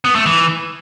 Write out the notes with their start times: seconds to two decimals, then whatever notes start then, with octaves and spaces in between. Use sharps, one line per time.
0.05 B3
0.15 A3
0.26 E3